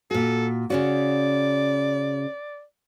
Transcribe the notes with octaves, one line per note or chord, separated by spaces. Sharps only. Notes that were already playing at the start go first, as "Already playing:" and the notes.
A#2 F#4 A4
C#3 C#4 F#4 D5